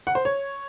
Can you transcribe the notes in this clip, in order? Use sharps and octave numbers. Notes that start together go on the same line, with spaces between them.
F#5
C5
C#5